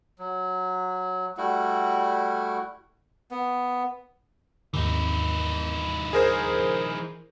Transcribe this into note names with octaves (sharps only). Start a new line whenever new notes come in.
F#3
G3 A3 E4 F#4
B3
D#2 G#2 D#3 E3 D#4
G#4 A#4 C5